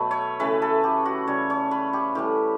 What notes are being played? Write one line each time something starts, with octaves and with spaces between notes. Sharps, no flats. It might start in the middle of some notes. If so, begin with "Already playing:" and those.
Already playing: B2 F#3 A3 B4
C#5
C#3 E3 A3 B4
A4
G4
F#4
C#3 G3 C#5
C#5
B4
G4
A2 E3 G3 G4